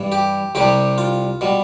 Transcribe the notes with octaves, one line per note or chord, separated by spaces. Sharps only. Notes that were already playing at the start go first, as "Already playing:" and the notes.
Already playing: G2 E3 G3
G4
C2 C3 G3 G4
F4
B2 G3